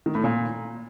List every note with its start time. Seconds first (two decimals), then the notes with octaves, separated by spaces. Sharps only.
0.06 D#3
0.15 A2
0.24 A#2